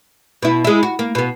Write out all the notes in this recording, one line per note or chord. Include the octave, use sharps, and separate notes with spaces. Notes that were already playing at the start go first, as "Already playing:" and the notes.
B2 E4
G#3 E4
F#4
A#3
B2 B3